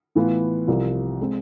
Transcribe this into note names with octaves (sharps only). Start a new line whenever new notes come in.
A2 E3 B3 F4
C2 C3 F3
G#3 C4